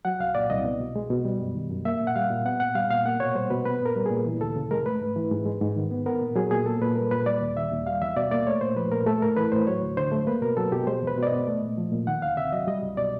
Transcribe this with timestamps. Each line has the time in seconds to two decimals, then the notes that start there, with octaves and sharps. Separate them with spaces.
0.05 F#3 F#5
0.20 C2 F5
0.35 A#2 D5
0.50 C2 D#5
0.65 B3
0.80 B2
0.96 G#3
1.10 B2
1.25 G3
1.40 F#2
1.55 D#3
1.70 F#2
1.85 A#3 E5
2.00 A#2
2.07 F#5
2.16 G3 F5
2.30 A#2
2.45 B3 F#5
2.60 A#2 F#5
2.75 G3 F5
2.90 A#2 F5
3.06 A#3 F#5
3.20 B2 C#5
3.35 G3 C5
3.50 B2 B4
3.65 B3 B4
3.80 A#2
3.86 A#4
3.96 G3
4.06 A#2 G#4
4.26 E3
4.40 D2 A4
4.56 C#3
4.71 G#3 A#4
4.86 A3 B4
5.01 G#2
5.16 E3
5.31 G#2
5.46 G#3
5.62 G#2
5.76 D#3
5.91 B3
6.06 B3 A#4
6.21 A#2
6.36 F#3 G#4
6.51 A#2 G#4
6.66 A#3 A4
6.82 A#2 B4
6.96 G3 A#4
7.11 A#2 B4
7.26 G3 D5
7.41 D#2
7.56 D#3 E5
7.72 D#2
7.87 G3 F5
8.01 E2 E5
8.16 B2 D5
8.31 A#3 D5
8.46 A3 C#5
8.61 A#2 C5
8.76 F3 B4
8.91 A#2 A#4
9.06 A3 A4
9.22 A2 A#4
9.37 E3 B4
9.52 A2 C5
9.67 F#3 C#5
9.82 D2
9.97 D3 C5
10.12 A3
10.27 A#3 B4
10.42 B2 A#4
10.57 F#3 A4
10.72 B2 G4
10.87 G#3 C5
11.02 E2
11.07 B4
11.17 B2
11.23 D5
11.27 D#5
11.32 B3
11.47 A3
11.62 A#2
11.78 F3
11.92 A#2
12.07 D#3 F#5
12.22 D2 F5
12.37 C3 E5
12.52 F#3 D#5
12.67 G3 D#5
12.83 C2
12.97 B2 D5